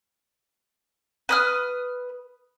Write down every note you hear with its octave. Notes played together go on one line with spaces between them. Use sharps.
B4 D#6 F6